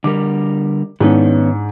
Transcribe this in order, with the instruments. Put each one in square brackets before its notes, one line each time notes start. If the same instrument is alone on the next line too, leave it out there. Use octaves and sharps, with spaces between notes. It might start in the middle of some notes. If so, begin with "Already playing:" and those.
[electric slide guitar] D3 G3 A#4 [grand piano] D6
[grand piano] G#2 D4 E4 [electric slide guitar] D#3 B3 C#4